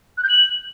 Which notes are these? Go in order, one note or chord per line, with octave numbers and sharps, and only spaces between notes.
F#6
G6
F#7